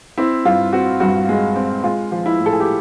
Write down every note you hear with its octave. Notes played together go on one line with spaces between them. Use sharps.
C4 E4
G2 F4
C4 F#4
G2 F#4
G#3
C4
G#3 F4
F3
E4
A2
A4
G#4
G4